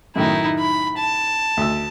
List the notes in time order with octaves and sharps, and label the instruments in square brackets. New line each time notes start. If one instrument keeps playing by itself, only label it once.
[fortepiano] F#2 A2 D#3 [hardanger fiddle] D#4 E4
[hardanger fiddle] B5
A5
[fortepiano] D2 E6